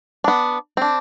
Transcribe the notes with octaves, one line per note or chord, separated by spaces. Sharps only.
B3 D4
C4 D4